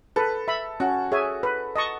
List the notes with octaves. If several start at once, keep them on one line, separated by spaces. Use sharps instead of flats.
A4 B4
E5 B5
C#4 F#4
G#4 C#5 E5 G#5
B4
D#5 A5 C#6